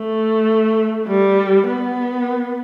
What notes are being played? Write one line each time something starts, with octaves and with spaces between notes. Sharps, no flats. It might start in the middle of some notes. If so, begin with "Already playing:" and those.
Already playing: A3
G3
B3